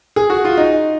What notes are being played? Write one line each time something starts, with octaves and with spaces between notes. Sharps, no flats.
G#4
F#4
F4
D#4